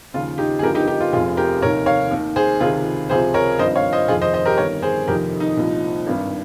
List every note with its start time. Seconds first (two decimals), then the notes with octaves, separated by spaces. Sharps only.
0.14 D#2 C#3 F3 F4
0.38 D#4 G4
0.59 G#4
0.63 G1 G2 F3 G4 A#4
0.75 D#4 G4
0.87 D#4 G4
1.00 F4
1.13 F1 F2 C3 F4 G#4
1.37 G4 A#4
1.62 F1 D#2 D#3 A#4 C#5
1.86 C#5 F5
2.11 D#2 D#3
2.36 G#4 C5
2.60 C#2 C3 D#3 F4 G#4
3.10 C#2 C3 F3 G#4 C5
3.34 A#4 C#5
3.59 G#1 G2 F3 C5 D#5
3.76 C#5 F5
3.93 C5 D#5
4.08 F1 F2 D#3 F4 G#4
4.22 C5 D#5
4.34 C5 D#5
4.46 G4 A#4
4.58 G1 G2 D#3 A#4 C#5
4.82 G#4 C5
5.07 F1 F2 D#3 G4 A#4
5.40 D#4
5.57 C2 A#2 F3
6.07 G#1 G2 D#3